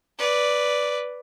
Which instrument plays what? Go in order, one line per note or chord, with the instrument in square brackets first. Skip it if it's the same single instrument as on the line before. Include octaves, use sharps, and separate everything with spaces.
[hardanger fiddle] B4 D5